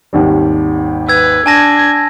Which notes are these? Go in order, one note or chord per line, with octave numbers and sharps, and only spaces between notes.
G#1 D#2 G3
B4 E6 G#6
D4 G#5 A5 G#6 A#6